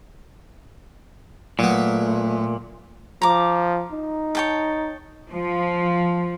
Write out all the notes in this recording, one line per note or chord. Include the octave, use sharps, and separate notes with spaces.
A#2 F#3 A3 B3
F3 A#5 D6
D#4
C#5 G5 A5
F3